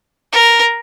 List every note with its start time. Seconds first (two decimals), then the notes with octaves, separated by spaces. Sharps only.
0.33 A#4